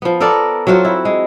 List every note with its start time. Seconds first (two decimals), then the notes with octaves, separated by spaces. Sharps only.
0.02 F3 B3
0.20 B3 A4 A#4 D5
0.67 F#3 C4 F4 F#4
0.85 E4
1.05 G#3